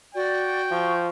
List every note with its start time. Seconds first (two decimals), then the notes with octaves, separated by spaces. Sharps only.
0.15 F#4 D5 G5
0.70 F3 C#6